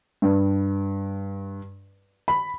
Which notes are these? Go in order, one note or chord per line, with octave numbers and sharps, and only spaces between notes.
G2
B5